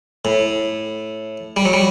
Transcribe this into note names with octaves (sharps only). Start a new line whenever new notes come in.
A2
G3
F#3
G3